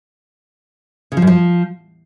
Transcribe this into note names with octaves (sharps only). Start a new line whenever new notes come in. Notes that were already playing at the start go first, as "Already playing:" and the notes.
C#3
F3
F#2
F3